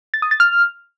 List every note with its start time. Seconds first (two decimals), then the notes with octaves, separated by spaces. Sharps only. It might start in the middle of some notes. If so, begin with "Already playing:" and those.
0.14 A6
0.22 D#6
0.31 A6
0.40 F6